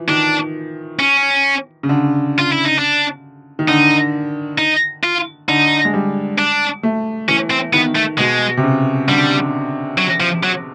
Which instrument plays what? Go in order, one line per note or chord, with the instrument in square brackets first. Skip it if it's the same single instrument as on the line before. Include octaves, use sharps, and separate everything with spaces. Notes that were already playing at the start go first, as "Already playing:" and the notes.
Already playing: [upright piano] E3 F3
[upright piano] D#3 [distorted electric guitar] D4
[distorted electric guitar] C#4
[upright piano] C#3
D3
[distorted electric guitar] F4
E4
D#4
D4
[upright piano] D#3
[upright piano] D3 [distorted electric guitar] D#4
[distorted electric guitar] D#4
F4
[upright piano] D3 [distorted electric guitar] D#4
[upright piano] G#3
G3
[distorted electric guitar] D4
[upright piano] A3
[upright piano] E3 [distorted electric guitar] C#4
[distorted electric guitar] C4
[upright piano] D#3 [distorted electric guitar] B3
[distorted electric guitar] A3
[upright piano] B2 [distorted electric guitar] G#3
[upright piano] C3
C#3
[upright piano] D3 [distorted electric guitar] G3
[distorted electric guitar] F#3
F3
F#3